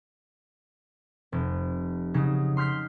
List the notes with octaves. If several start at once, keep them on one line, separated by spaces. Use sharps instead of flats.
F1
C#3 F#3 D#4
C6 F6 G6 B6 C7